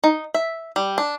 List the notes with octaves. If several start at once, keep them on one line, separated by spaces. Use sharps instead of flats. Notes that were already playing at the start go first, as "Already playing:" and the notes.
D#4
E5
G3
D4